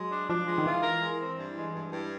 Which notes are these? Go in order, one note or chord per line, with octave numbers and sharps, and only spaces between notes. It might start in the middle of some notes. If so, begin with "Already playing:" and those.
Already playing: F#3 G#3
D4
F3 D4
G#3
D#3
E3 F4
A#4
G#3
C4
G2
G#3
G2
G2